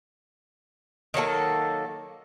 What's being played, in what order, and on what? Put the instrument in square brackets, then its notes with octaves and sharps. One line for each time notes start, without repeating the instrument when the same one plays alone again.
[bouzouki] D#3 F#3 A#3 A4